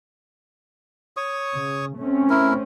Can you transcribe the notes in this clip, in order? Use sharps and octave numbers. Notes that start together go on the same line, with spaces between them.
C#5 C#6 D#6
C#3
A3 C4 C#4
E4 A#4